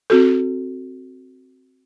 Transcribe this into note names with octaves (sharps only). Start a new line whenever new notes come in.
C4 F#4 A4